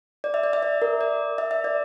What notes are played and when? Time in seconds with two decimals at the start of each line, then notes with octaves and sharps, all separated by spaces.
0.24 D5
0.34 E5
0.43 D5
0.53 E5
0.63 D5
0.82 A#4
1.01 D5
1.38 E5
1.51 E5
1.64 D5